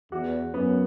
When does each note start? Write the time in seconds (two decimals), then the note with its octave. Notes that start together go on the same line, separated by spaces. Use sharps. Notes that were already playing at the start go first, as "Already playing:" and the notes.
0.12 E2 F#4
0.54 F#2 B3